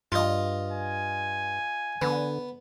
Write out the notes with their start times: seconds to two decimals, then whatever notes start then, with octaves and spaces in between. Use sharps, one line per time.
0.12 G2 F4 D#5
0.72 G#5
2.02 D3 B3